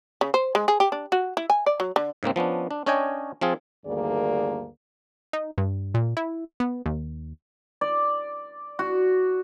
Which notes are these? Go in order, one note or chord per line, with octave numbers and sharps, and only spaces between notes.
C#3
C5
G#3
G#4
G4
D4
F#4
E4
G#5
D5
F#3
D3
G#2 C#3 A#3 C4
F3 B3 C#4 D4
D4
C#4 D4 C#5 D#5 G5 G#5
F3 C4 F4 G#4
D2 G2 D#3 A#3 G#4 D5
D#4
G2
A#2
E4
B3
D#2
D5
F#4